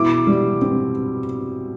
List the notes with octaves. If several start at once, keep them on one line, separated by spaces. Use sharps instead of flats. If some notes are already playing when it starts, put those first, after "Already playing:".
Already playing: B2 E4 D6
G3
C4